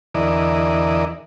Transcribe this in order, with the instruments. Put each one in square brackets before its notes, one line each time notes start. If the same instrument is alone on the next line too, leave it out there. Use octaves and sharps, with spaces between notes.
[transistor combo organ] E2 D3 E3 A#4 D5 D#5